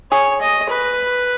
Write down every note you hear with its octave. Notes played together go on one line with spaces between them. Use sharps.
G#4 C#5
D#5
B4